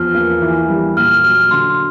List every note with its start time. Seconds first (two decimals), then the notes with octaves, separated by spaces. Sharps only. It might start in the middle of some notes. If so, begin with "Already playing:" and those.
Already playing: E2 F3 F6
0.15 A#3
0.42 E3
0.69 G3
0.97 A#2 F6
1.24 F#3 F6
1.51 D3 C6